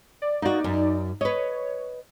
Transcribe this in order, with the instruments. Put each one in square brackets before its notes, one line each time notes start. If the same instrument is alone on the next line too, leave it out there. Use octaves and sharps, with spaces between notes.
[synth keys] D5
[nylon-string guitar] A#3 F#4 [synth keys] D#4 D5
[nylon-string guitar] F#2
[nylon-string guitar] B4 D#5 [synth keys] C#5